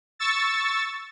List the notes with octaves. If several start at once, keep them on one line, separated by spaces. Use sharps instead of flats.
C#6 E6 A6